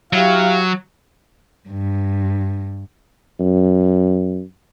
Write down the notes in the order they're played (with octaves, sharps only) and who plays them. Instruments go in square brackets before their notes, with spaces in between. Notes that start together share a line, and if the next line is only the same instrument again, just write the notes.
[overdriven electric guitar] F#3 [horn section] E4 G4 F5
[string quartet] G2
[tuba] F#2